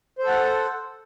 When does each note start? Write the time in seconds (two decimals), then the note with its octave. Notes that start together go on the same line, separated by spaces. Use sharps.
0.19 C5
0.23 A4
0.28 F#5